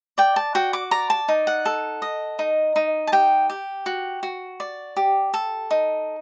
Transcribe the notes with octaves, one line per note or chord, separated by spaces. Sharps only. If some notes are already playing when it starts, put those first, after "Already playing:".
D5 G5
A5
F#4 G5
D6
D5 A#5
A5
D#4
F#5
A4
D#5
D#4
D#4
A5
G4 G5
G4
F#4
F#4
D5
G4
A4
D#4